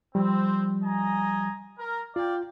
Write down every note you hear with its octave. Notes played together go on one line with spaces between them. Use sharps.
F3 G3 C4
D#5 G#5 A#5
A#4
F4 D5 F5 G5